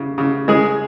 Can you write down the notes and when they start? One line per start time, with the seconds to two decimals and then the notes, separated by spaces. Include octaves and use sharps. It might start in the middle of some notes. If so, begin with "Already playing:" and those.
Already playing: C#3
0.18 C#3
0.48 C#3 G#3 G#4